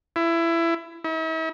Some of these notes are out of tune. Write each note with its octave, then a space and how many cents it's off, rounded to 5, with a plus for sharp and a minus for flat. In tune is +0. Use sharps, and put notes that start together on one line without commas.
E4 +20
E4 -45